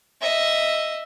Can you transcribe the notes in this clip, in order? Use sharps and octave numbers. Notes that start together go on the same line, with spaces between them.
D#5 E5